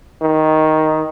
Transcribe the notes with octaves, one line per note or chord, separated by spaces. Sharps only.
D#3